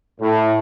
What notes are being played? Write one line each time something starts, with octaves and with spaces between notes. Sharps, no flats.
A2